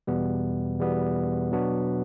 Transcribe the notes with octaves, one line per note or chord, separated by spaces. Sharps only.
E2 B2 G3 B3
E2 B2 G3 B3
B2 F#3 B3 D4 F#4